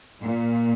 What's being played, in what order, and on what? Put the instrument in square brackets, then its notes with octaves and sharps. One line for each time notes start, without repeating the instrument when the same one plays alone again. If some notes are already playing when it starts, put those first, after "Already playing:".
[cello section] A#2